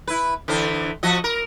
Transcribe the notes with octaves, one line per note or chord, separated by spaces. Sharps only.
E4 B4
D3 E3 C5
F3 F#4 D#5
A#4